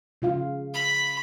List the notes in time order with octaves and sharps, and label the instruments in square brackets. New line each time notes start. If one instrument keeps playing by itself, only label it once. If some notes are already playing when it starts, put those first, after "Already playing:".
[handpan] C#3 F4 F5
[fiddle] B5